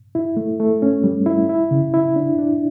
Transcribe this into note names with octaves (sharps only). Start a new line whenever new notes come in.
E4
A3
A3
C#4
G3
E4
E4
C#3
E4
D4
D4